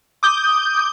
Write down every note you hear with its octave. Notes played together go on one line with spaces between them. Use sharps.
D6 D#6 G6 G7